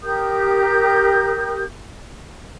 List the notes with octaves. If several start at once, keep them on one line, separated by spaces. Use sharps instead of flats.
G4 A#4 D#6 G6